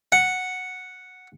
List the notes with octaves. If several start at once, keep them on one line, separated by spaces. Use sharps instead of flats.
F#5